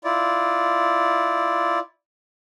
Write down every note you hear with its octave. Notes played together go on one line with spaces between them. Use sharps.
E4 F4 D5